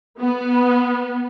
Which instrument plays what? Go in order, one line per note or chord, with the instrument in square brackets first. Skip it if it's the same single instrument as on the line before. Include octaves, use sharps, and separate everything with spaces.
[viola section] B3